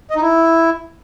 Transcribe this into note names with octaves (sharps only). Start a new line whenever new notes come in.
D#5
D#4
E4